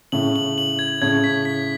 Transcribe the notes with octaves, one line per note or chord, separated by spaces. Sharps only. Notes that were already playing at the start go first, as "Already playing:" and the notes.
A2 C#3 F#7
F#7
F#7
G#6
A2 C#3 G#6
B6
B6